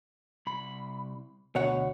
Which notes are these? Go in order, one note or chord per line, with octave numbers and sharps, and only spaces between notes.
C2 B5
D2 B2 C#5 F#5